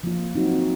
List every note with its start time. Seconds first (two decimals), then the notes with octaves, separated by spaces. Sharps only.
0.03 F3 A#3 F4
0.34 F#3 C4 D#4 F#4